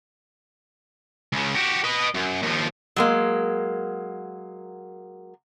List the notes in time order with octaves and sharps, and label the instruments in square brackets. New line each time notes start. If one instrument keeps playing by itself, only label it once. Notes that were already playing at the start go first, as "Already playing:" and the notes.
[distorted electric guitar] C#2 C#3
F#4 G4
B4 D#5
F#2
D#2 F3
[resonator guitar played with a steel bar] F#3 G#3 A#3